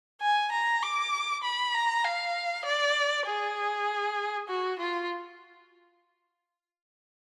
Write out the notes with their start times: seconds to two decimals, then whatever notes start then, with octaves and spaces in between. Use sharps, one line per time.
0.21 G#5
0.52 A#5
0.82 D6
1.43 B5
1.74 A#5
2.04 F5
2.65 D5
3.27 G#4
4.48 F#4
4.79 F4